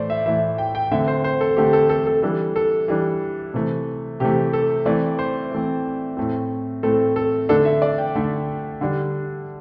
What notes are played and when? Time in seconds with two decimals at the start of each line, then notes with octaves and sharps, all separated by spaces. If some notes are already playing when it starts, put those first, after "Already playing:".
Already playing: A2 E3 A3 C5 D5
0.10 E5
0.26 A2 E3 A3 E5
0.58 G5
0.75 G5
0.91 D3 A3 C4 E5
1.08 C5
1.24 C5
1.41 A4
1.57 D3 A3 C4 G4
1.73 A4
1.89 A4
2.07 A4
2.22 E3 G3 D4 A4
2.56 A4
2.88 E3 G3 D4
3.54 C3 E3 A3
4.20 C3 E3 A3 G4
4.53 A4
4.86 E3 A3 C4 D5
5.19 C5
5.51 E3 A3 C4
6.17 A2 A3 C4
6.83 A2 A3 C4 A4
7.16 A4
7.49 D3 A3 D4 A4
7.65 E5
7.82 D5
7.98 G5
8.15 D3 A3 D4
8.81 D3 G3 D4